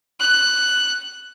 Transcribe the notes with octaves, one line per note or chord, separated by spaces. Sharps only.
F#6